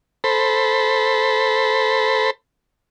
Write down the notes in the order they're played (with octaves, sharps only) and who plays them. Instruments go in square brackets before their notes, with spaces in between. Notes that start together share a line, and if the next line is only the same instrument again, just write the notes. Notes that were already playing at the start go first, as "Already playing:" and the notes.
[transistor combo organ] A4 C5 B5